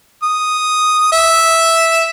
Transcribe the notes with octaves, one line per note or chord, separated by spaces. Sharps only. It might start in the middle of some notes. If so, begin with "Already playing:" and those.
D#6
E5